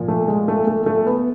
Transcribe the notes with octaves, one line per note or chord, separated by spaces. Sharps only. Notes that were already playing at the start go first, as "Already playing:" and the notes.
Already playing: A#2 F3
A3
G#3
A3
A3
A3
B3